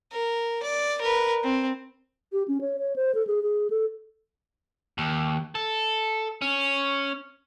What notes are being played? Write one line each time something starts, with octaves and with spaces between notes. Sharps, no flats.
A#4
D5
A#4 B4
C4
G4
C#4
C#5
C#5
C5
A4
G#4
G#4
A4
D#2
A4
C#4